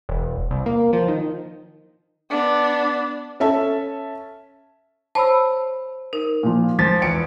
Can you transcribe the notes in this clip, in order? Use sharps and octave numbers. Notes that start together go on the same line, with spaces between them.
E1
C2
A#3
F3
D#3
B3 D4
C#4 A4 E5 A5
C5 C#5 A5 B5 E6
D#4 A#4
A#2 F3
F3 G#3 A6
E2 C#7 D7